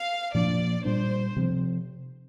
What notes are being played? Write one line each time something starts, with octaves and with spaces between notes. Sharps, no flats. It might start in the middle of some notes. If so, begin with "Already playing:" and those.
Already playing: F5
A#2 F3 A#3 D4 D5
A#2 G3 D4 C5
C3 F3 C4